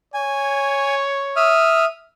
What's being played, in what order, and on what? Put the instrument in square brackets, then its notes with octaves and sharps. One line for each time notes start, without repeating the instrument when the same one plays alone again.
[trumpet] C#5 [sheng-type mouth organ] G#5
[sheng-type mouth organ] E5 D#6 F6